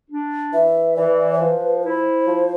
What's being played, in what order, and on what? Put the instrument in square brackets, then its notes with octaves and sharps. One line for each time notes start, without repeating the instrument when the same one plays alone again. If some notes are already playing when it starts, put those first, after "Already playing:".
[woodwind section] D4
[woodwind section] E3 [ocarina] E5
[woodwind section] E3 [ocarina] D5
[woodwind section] F3 [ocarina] B4
[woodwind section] E4 [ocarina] C5
[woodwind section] F3